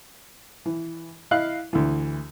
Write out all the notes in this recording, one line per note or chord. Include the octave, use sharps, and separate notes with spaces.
E3
E4 D#5 F5 F#6
D2 E3